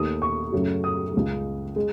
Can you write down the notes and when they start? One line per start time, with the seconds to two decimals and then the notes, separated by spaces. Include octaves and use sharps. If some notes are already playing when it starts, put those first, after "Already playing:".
Already playing: D#2 D#3 A3 D#6
0.22 C#6
0.52 F#2 C#3 F#3 A3
0.84 D#6
1.14 C#2 C#3 G#3
1.76 G#3